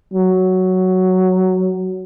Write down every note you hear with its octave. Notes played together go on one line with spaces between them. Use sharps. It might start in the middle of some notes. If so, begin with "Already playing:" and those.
F#3